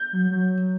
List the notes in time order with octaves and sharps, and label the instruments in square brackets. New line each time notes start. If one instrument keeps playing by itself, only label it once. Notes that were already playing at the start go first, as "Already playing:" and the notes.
Already playing: [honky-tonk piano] G6
[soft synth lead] F#3
F#3